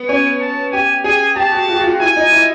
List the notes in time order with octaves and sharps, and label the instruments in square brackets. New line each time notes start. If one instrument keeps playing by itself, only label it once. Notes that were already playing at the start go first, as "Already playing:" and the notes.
Already playing: [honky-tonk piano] B3
[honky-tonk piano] C#4 [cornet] G#5
[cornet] A5
[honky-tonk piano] G4 [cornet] G#5
[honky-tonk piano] G#4 [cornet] G#5
[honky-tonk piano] G4 [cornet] A5
[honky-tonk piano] F#4
F4
F#4
F4
[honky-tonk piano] E4 [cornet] G#5
[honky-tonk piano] D#4
E4